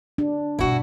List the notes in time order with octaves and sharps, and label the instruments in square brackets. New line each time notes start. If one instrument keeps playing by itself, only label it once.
[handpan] D4
[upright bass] G2 B2 [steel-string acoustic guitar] E4 F#4